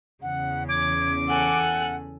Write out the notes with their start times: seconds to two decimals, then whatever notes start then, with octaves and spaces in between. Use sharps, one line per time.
0.22 E2 C#3 F#5
0.69 D6 G#6
1.28 A4 F#5 G#5 F#6